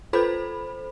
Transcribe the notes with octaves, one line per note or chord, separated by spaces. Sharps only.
F4 A4 B4 C5 B5